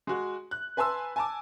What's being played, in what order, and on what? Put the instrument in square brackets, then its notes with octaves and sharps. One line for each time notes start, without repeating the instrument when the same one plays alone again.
[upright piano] G#3 F#4
F#6
B4 G#5 A5 C6 E6
G#5 A5 D6